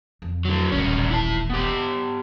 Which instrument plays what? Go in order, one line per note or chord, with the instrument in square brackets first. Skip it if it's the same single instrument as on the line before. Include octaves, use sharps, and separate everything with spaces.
[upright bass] F2
[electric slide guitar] D3 F#3
[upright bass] D#1 A1 [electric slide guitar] G2 C#4
[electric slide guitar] E4 A5
B3 G4